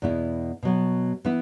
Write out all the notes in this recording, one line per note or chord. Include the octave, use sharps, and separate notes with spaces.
E2 B2 B3 E4
B2 F#3 B3
E3 B3 E4